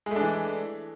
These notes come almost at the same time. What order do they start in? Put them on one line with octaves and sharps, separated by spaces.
G#3 A3 D4 E3